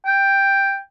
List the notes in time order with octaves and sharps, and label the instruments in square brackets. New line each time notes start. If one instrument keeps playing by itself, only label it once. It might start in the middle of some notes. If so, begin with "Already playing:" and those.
[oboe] G5